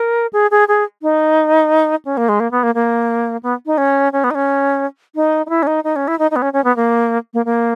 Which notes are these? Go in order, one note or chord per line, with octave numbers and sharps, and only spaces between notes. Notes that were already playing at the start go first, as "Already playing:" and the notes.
Already playing: A#4
G#4
G#4
G#4
D#4
C#4
A#3
G#3
A#3
B3
A#3
A#3
B3
D#4
C#4
C#4
B3
D#4
C#4
D#4
D#4
E4
C#4
D#4
D#4
C#4
E4
D#4
D#4
B3
C#4
C#4
B3
A#3
A#3
A#3